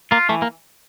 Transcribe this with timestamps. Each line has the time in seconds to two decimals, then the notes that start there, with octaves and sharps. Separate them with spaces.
0.11 A#3 F4
0.29 E3 A3
0.42 A#3